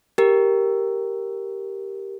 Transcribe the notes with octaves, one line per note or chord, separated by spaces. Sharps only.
G4 A#4